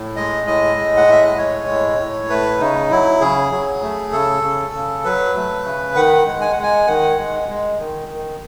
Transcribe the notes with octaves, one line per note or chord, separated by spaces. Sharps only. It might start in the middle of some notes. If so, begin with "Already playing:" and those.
Already playing: A2
G#3 D#5
A2 D#5
G#3
F#5
A2 E5
D#5
G#3 C#5
A2
A2
A3 B4
C#3 D#4
F#3 E4
C#3 G#4
F#3
A3
C#3 A4
C#3
C#3
F#3 B4
A3
C#3
D#3 F#5
G#3
G#5
G#3 F#5
G#5
D#3 F#5
G#3
G#3
D#3
D#3